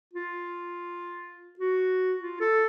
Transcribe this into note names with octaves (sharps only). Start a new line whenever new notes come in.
F4
F#4
F4
A4